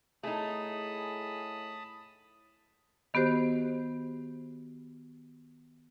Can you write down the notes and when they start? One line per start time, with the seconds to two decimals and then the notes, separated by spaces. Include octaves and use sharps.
0.23 A2 A3 D#4 G#4 A5 B5 D#6
3.14 D#3 B3 F#4 G4 C5